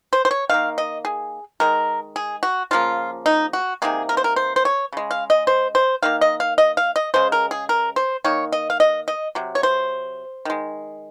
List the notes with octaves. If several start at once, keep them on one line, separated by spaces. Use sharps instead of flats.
C5
C5
C#5
D#3 A#3 F5
D#5
G#4
D#3 G#3 A#4
G#4
F#4
C#3 F3 A#3 F4
D#4
F#4
C3 D#3 A#3 G#4
A#4
C5
A#4
C5
C5
C#5
C#3 G#3
F5
D#5
C5
C5
D#3 A#3 F5
D#5
F5
D#5
F5
D#5
C#3 G#3 C5
A#4
G#4
A#4
C5
D#3 A#3 C#5
D#5
F5
D#5
D#5
C3 F#3
C#5
C5
D#3 G#3